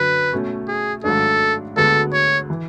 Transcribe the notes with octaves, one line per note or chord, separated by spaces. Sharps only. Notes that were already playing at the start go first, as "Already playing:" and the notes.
Already playing: F#2 D3 F#3 B4
B2 A3 C#4
G#4
G#1 G#2 F#3 A3 D4 A4
D2 D3 G#3 B3 F#4 A4
C#5
E3